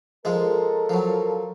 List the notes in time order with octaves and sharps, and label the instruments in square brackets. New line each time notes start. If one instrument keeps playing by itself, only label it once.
[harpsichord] F3 G#3 [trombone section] A#3 A4 A#4
[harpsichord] F3 F#3